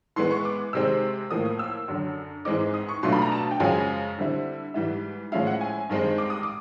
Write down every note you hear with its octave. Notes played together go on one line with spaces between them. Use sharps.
E3 G#3 B3 C6
C#6
D6
C3 D#3 G#3 C4 E6
A2 F3 A#3 D#6
D#6
E6
F#2 D3 F#3
G#2 E3 G#3 C4 D#4 D6
D#6
C#6
B2 F#3 A3 D4 F4 C6
B5
A#5
A5
G5
F#2 C#3 F3 G#3 G#5
D3 G3 C4 E4
G#2 E3 G3 E5
A2 F3 G#3 C#4 E4 F5
F#5
G#5
G2 D#3 G#3 C4 D#4
D6
D#6
D6